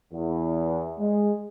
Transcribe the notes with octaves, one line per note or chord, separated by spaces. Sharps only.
E2
G#3